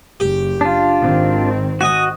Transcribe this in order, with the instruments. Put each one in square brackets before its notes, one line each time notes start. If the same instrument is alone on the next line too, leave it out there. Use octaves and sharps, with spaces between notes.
[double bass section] F#1 [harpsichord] G4
[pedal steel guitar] D4 F4
[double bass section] G#1 D#3 C4
[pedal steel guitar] F#4 D#5 [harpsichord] G#5 D#6